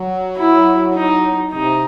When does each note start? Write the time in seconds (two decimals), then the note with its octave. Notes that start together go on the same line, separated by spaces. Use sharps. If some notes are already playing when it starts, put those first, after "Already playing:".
Already playing: F#3
0.38 E4
0.95 D#4
1.52 C3 D#4